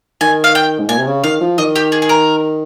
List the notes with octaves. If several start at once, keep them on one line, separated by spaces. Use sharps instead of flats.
D#3 G#5
F5
G5
G#2
A#2 G#5
C3
C#3
D#3 F5
F3
D#3 D#5
G4
G#4
G#4
A#4